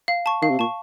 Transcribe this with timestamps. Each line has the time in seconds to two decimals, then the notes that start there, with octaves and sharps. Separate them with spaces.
0.08 F5
0.26 A5 C#6
0.42 D#3 F5
0.50 C3
0.59 A#2 A5 C#6